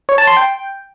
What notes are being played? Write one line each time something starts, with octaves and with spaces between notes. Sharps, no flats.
C#5
A5
C6
G5